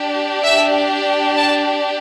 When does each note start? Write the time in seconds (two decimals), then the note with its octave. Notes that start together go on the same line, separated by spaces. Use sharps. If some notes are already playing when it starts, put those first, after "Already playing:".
Already playing: D4 G4
0.44 E5
1.37 A5